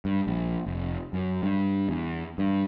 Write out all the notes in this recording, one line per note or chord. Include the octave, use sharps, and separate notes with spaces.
G2
A#1
F1
F#2
G2
E2
G2